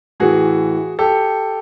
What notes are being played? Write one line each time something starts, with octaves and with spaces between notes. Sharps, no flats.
A2 E3 F#4 G#4
G4 A4